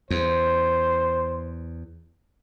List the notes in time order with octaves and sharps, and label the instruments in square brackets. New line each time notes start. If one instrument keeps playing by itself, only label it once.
[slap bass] E2 [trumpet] C5